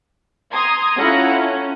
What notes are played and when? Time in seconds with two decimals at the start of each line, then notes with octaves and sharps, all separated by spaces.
0.52 A#5 C6 D#6 G#6
0.98 C#4 E4 F4 A4 F#5 A#5
1.33 C#4